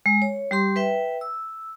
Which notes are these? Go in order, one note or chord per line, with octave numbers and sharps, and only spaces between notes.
G#3
C#5
G3 G4 C6
B4 E5 G5
E6